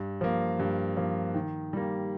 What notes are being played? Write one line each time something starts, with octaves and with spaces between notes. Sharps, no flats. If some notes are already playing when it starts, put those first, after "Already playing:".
Already playing: G2
F3 A#3
G2
F3 A#3
D#3
G3 A#3